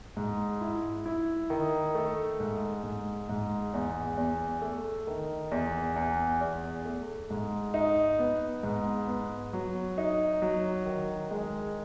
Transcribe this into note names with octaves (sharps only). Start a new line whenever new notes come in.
G#2
E4
E4
D#3
A3
G#2
G#2
G#2
E2
E2
A3
D#3
E2
E2
E2
A3
G#2
D#4
B3
G#2
B3
F#3
D#4
F#3
D#3
G#3